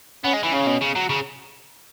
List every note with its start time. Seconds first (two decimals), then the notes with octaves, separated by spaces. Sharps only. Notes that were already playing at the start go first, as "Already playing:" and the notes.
0.24 B3 C#4
0.33 G#3
0.43 E3
0.52 C#3 C#4
0.66 B2
0.81 C#3
0.95 F#3
1.09 C#3